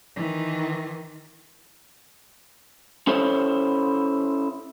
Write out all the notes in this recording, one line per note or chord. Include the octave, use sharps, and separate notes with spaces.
D#3 E3
C#4 E4 A4 C5 C#5